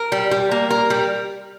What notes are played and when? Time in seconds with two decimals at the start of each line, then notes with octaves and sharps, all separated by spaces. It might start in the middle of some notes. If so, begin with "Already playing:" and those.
Already playing: A#4
0.12 G3
0.31 G3
0.51 A#3
0.70 A#4
0.90 G3